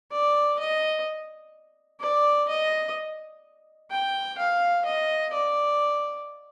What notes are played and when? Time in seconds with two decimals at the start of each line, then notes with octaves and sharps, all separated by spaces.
0.11 D5
0.59 D#5
2.01 D5
2.48 D#5
3.91 G5
4.38 F5
4.85 D#5
5.33 D5